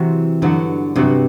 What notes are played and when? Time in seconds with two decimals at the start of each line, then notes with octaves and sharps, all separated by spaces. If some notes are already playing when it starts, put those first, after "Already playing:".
Already playing: C3 E3 F#3 C4 F#4
0.42 G2 D3 F#3 B3 F#4
0.96 G2 C3 F#3 B3 F#4